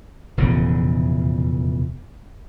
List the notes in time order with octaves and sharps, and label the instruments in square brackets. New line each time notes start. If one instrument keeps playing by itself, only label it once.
[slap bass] F1 E2 A#2 C#3